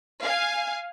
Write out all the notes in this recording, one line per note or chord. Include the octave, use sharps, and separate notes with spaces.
F5 G#5